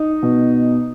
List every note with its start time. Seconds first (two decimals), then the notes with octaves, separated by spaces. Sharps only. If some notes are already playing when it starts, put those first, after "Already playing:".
Already playing: D#4
0.22 B2